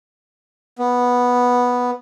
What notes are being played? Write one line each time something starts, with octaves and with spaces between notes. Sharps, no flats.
B3